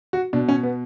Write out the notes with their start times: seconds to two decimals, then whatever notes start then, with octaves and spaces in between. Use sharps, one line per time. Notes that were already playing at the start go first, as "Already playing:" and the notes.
0.13 F#4
0.33 B2 D4
0.48 C#4
0.63 B3